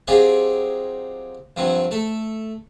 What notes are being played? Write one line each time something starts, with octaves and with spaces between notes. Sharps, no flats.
F#3 C4 D#4 F4 G4 G#4
G2 F3 F#3 C4
A3 A4